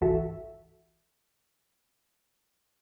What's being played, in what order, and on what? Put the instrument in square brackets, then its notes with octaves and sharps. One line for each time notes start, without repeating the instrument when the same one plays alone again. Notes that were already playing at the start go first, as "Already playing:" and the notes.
[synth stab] G#1 C#2 E3 F#4 A4 E5